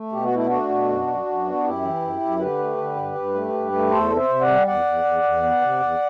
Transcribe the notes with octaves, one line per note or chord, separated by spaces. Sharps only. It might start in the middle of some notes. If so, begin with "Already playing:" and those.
Already playing: A3
B2 G4
F#4
A3 E4
A3 D4 F#4
B2
F#2
F#2
F#2
B3
F#2 E4 G4
E3
F#2
F#2
D3 G4 B4
A3
D3
G2
G2
A3
G2
A3
E2 A4 C5
C3
C5 E5
C3
D5 F#5
G3
E2 D5 F#5
E2
E2
E2
B3
C3
E2